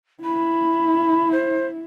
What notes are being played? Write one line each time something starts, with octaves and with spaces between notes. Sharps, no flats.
E4 B5
C5